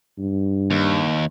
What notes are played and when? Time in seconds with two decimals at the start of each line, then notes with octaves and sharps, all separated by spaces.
0.18 G2
0.71 D#2